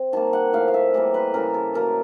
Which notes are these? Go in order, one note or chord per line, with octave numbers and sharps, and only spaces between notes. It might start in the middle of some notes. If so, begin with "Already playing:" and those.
Already playing: C4
D#3 G3 A#3 A5
F#5
A2 F3 A3 F5
F5
E5
A2 E3 G3 A#3
B4
C#3 E3 G3 A#3 A#4
A4
A2 F#3 A#3 A#4